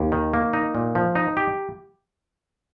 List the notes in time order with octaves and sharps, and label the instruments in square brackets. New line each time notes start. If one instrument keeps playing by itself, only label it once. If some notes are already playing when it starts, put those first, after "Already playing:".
Already playing: [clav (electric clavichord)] D#2
D#3
A#3
D#4
A#2
F3
D#4
G4